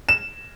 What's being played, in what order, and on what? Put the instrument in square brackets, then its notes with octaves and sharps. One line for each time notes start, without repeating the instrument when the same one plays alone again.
[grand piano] E7